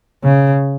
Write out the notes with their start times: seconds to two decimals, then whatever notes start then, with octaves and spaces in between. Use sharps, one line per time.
0.24 C#3